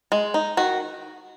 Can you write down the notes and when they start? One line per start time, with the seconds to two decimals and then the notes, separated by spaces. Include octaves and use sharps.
0.12 G#3
0.34 D#4
0.57 D#3 F#4